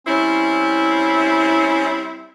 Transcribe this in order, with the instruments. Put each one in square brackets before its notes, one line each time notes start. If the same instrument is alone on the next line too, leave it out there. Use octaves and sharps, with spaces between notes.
[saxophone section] G3 C4 E4 [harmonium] C#4